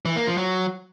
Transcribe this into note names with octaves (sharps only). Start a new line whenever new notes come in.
E3
A#3
F3
F#3